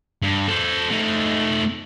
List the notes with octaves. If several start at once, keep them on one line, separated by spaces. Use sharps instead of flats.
G2
A4 C5
A3 D#4